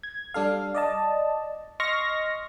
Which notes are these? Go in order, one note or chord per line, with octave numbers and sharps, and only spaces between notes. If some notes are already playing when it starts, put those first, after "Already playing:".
G#6
G3 D4 A4 F5
D5 D#5 A5
D#5 C6 C#6 F6 A#6